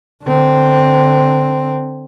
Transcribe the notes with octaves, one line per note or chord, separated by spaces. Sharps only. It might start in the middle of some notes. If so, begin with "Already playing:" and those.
D3 C4